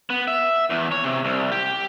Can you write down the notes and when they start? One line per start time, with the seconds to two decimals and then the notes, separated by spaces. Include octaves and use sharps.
0.10 B3
0.28 E5
0.70 E2
0.92 C#5
1.03 C3
1.25 C2
1.52 G4